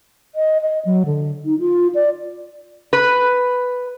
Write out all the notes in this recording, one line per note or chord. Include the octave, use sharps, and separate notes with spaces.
D#5
D#5
F#3
D3
D#4
F4
D5
B4